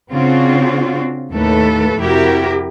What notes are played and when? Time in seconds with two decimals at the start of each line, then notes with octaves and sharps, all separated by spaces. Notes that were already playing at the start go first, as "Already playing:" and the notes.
0.12 C#3 C4 D4 F4 F#4
1.31 D#2 A2 A3 A4 B4
1.99 F2 C3 E4 F#4 G4 A#4